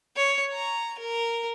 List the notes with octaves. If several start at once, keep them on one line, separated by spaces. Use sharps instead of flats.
C#5
A#5
A#4